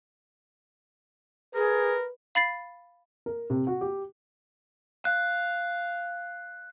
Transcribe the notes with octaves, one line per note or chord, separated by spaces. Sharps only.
G#4 A#4 B4
F5 B5 A6 C7
A#4
C3
F#4
G4
F5 F#6